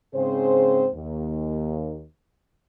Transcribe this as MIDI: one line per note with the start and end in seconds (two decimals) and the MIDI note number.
0.15 0.87 44
0.15 0.87 49
0.15 0.87 60
0.15 0.87 68
0.15 0.87 72
0.94 2.05 39